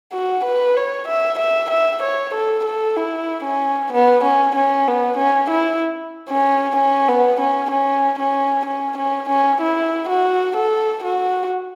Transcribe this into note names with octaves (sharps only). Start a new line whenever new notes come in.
F#4
B4
C#5
E5
E5
E5
C#5
A4
A4
E4
C#4
B3
C#4
C#4
B3
C#4
E4
C#4
C#4
B3
C#4
C#4
C#4
C#4
C#4
C#4
E4
F#4
A4
F#4